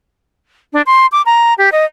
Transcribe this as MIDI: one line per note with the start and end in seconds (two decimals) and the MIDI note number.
0.73 0.82 62
0.86 1.06 84
1.12 1.22 86
1.26 1.54 82
1.58 1.70 67
1.72 1.85 75